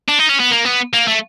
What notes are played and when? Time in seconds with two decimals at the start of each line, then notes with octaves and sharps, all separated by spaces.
0.08 D4
0.19 D#4
0.29 C#4
0.40 B3
0.51 A#3
0.65 B3
0.93 A#3
1.08 A3